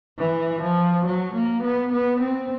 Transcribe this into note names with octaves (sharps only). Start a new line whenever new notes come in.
E3
F3
F#3
A#3
B3
B3
C4